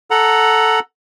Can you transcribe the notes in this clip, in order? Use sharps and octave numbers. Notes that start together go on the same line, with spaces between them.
A4 F#5 A#5